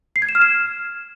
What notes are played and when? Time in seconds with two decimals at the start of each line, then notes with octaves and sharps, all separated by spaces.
0.16 C7
0.22 G#6
0.29 E7
0.35 F6
0.41 E7